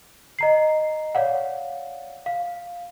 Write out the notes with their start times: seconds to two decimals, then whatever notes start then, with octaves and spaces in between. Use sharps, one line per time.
0.39 D#5 A#5 C7
1.15 C#5 D5 F5 F#5
2.26 F5